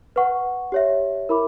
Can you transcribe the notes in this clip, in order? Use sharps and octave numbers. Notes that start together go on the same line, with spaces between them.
B4 F#5 C#6
G4 C#5 E5
E4 A#4 E5 B5 D6